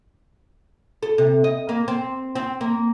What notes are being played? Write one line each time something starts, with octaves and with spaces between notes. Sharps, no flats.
A4
C3
D#5
A#3
C4
C4
A#3